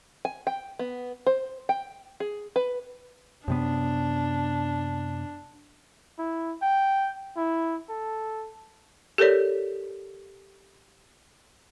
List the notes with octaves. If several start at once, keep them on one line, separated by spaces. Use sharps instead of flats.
G#5
G5
B3
C5
G5
G#4
B4
F#2 C3 B3 D4
E4
G5
E4
A4
G4 A4 A#4 C#5 D5